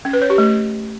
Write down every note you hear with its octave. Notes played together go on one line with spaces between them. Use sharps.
C#4
B4
C#5
G4
A3